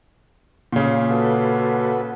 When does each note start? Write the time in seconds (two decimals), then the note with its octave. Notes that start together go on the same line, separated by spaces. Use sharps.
0.73 A#2 C#3
1.11 F#4 A4 B4